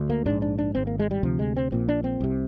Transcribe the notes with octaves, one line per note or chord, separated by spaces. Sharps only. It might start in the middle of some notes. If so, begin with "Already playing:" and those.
Already playing: D2 D3
A#3
A#1 G#2 D4
D4
D4
G#1 G#2 C4
A#3
G#3
G3
D2 C3 F3
G#3
C4
A#1 A#2 C4
D4
C4
C2 C3